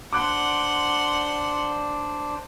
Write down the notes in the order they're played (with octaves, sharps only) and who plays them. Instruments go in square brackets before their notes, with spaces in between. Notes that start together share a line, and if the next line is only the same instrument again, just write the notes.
[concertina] D4 C5 D5 [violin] F#5 C6 [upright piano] D6 F#6